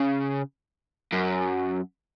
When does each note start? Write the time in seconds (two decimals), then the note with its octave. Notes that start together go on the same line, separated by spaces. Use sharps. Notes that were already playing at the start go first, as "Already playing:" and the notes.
Already playing: C#3
1.13 F#2